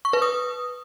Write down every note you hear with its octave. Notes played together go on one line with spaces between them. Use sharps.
C#6
B4
D#6